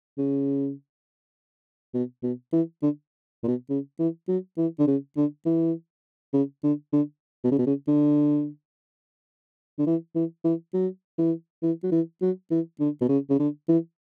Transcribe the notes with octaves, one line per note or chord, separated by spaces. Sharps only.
C#3
B2
B2
E3
D3
A#2
B2
C#3
E3
F#3
E3
D3
C#3
D3
E3
C#3
D3
D3
B2
C#3
B2
C#3
D3
D3
E3
E3
E3
F#3
E3
E3
F#3
E3
F#3
E3
D3
B2
C#3
C#3
D3
E3